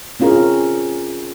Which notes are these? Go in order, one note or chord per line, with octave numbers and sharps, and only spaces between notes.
C4 C#4 F4 G#4 A#4